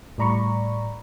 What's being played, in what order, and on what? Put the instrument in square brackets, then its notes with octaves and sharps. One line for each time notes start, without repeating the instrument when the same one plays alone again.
[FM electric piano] A2 G3 D5 A#5 B5 C#6